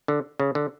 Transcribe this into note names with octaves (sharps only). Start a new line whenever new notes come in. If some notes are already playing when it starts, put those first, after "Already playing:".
D3
C#3
D3